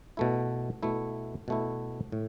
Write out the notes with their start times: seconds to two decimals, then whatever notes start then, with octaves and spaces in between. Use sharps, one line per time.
0.17 B2 A3 E4
0.83 B2 A3 E4
1.48 B2 A3 E4
2.12 A2